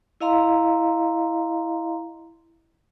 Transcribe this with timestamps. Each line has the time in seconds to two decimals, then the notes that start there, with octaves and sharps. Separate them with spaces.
0.20 E4 D#5 F5 A#5 C6